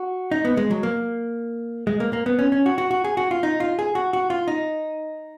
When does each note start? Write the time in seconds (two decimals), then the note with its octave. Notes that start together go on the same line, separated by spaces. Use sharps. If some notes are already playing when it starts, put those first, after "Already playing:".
Already playing: F#4
0.31 D#4
0.45 B3
0.57 G#3
0.71 F#3
0.83 A#3
1.87 G#3
2.00 A#3
2.13 A#3
2.26 B3
2.39 C#4
2.52 C#4
2.66 F#4
2.78 F#4
2.91 F#4
3.04 G#4
3.17 F#4
3.31 F4
3.43 D#4
3.60 F4
3.79 G#4
3.95 F#4
4.13 F#4
4.30 F4
4.48 D#4